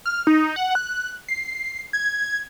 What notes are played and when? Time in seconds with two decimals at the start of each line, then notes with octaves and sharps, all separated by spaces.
0.06 F6
0.27 D#4
0.56 F#5
0.75 F#6
1.28 C7
1.93 G#6